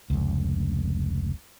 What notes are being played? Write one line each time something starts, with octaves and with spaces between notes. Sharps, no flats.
F1 C#2